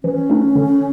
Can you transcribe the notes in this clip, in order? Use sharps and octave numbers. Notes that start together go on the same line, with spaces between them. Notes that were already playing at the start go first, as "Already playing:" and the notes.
E3 C#4
A3 D4
D3